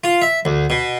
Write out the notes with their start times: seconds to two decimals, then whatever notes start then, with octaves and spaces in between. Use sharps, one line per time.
0.04 F4
0.22 E5
0.45 D2
0.70 B2